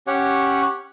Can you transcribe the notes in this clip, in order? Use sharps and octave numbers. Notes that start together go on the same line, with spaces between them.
C#4 G4 C#5 F#5